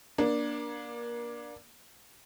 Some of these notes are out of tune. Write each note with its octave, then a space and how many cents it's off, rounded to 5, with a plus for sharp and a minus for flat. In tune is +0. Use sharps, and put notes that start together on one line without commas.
A#3 +30 D4 +0